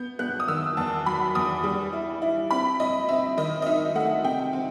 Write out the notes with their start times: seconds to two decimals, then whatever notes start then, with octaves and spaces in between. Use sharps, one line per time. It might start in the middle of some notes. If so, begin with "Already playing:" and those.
Already playing: B3 G6
0.19 B3 F#6
0.40 D#6
0.48 D#3 E6
0.77 E2 A5
1.06 F#3 B5
1.35 E2 D#6
1.64 G3
1.93 E4
2.22 E4
2.51 C4 B5
2.80 C4 D#5
3.09 C4 E5
3.37 D#3 D#5
3.62 D#5
3.66 D#4 E5
3.95 A3 F#5
4.24 C3 G5
4.53 C4